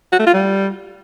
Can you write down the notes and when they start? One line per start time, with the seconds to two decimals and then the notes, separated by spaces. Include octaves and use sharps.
0.12 F#4
0.19 A3
0.27 F4
0.34 G3